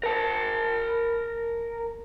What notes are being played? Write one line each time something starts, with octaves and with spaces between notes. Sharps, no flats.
A#4 A5